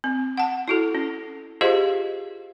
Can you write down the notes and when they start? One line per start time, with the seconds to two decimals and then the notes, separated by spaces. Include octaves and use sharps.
0.04 C4
0.37 F#5 A5
0.68 E4 F#4 A4
0.95 C#4
1.61 F4 G4 G#4 C5 D#5 F5